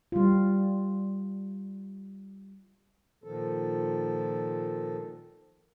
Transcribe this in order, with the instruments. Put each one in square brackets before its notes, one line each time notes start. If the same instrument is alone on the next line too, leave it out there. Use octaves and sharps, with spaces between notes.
[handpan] G3 F4
[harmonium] A#2 D#3 F3 A4